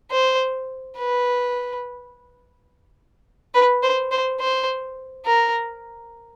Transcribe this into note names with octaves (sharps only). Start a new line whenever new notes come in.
C5
B4
B4
C5
C5
C5
A#4